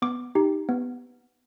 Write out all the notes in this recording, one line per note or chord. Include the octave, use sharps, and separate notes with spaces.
B3 D6
D#4 G4
B3